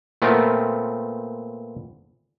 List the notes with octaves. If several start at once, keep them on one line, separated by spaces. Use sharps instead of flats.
A#2 A3 B3 C4 A#4